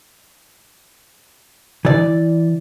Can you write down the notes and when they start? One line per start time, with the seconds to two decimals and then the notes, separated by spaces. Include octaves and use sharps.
1.85 E3 D5